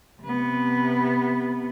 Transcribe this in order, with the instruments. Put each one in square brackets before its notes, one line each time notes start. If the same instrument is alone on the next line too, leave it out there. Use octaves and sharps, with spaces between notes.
[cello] C3 B3